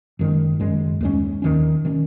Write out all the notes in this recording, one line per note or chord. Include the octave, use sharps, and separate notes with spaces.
F#1 F#2 D#3 G#3
F#1 F#2 D#3 G#3
D#2 D#3 G#3 C#4
D#2 D#3 G#3 C#4
D#3 G#3 C#4